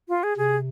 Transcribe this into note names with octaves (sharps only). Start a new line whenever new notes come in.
F4
G#4
C3 G#4